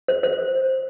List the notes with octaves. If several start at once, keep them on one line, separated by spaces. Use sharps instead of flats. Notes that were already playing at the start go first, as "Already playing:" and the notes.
C5
C5